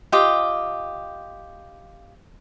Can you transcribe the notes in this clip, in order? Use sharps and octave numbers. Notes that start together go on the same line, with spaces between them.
F4 G4 D#5 G5